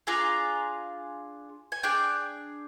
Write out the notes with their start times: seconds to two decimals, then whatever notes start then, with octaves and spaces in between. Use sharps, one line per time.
0.07 D4 F4 G#4 A#5
1.72 G#5
1.83 D4 G#4 G5